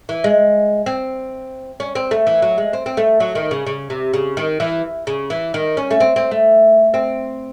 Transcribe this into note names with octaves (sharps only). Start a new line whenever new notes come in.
E3
G#3
C4
C#4
C4
A3
E3
F#3
G#3
C4
C4
A3
F#3
D#3
C#3
C#3
C3
C#3
D#3
E3
C#3
E3
D#3
C#4
A3
C4
C4
A3
C4